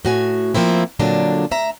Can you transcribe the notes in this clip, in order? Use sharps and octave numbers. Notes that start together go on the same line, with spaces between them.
A2 F#4 G#5
F3 A#3 C4 E4
F2 A#2 D3 F#3 D4
D2 E5 A#5